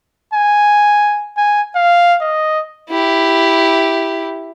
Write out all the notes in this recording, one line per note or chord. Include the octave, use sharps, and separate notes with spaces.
G#5
G#5
F5
D#5
E4 G4